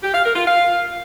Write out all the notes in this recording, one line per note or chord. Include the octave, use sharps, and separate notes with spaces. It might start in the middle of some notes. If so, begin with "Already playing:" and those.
G4
F5
A#4
F4
F5